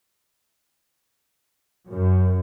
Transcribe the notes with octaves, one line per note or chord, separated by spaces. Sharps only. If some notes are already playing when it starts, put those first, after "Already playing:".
F#2